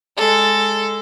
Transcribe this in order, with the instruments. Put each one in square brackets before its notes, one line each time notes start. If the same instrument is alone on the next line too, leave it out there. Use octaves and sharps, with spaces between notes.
[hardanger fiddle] G#3 A4